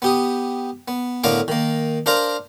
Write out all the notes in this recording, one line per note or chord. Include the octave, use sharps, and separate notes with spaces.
B3 G4 D#6
B3
A2 D3 B3 A#4 F5 D6
D#3 A#3
D4 A#4 C5 F5 A#5